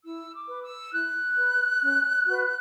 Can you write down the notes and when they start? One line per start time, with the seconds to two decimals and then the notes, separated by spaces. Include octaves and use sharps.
0.04 E4 E6
0.33 D6
0.48 B4
0.63 E6
0.92 E4 F#6
1.37 B4
1.82 C#4
2.26 F#4 B4